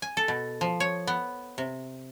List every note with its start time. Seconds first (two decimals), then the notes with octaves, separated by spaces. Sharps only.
0.02 G#5
0.17 A4
0.28 B2
0.61 F3
0.80 C#5
1.07 B3
1.58 C3